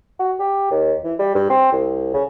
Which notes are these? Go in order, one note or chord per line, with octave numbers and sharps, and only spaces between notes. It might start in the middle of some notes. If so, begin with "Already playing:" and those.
F#4
G4
D#2
E3
G3
G2
C4
C2
C#3